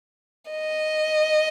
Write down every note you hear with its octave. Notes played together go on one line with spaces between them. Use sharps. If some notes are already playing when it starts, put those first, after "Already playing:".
D#5